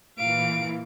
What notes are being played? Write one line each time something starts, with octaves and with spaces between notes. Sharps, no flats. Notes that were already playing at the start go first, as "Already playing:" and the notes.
A#2 E3 F5 D7